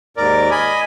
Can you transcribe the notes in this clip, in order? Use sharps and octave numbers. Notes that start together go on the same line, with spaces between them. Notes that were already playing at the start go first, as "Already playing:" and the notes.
D#2 G#2 A#4 D5
D#5 G#5 B5